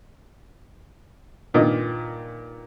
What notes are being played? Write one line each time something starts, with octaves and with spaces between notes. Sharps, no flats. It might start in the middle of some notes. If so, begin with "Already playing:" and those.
G2 A#2 D#3 A#3 F4 D#5